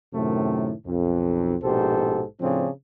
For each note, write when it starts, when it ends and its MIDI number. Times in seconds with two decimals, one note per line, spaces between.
0.14 0.72 42
0.14 0.72 45
0.14 0.72 48
0.14 0.72 51
0.14 0.72 57
0.86 1.55 35
0.86 1.55 41
1.62 2.22 34
1.62 2.22 44
1.62 2.22 47
1.62 2.22 67
1.62 2.22 69
1.62 2.22 72
2.40 2.67 45
2.40 2.67 49
2.40 2.67 53
2.40 2.67 60
2.40 2.67 62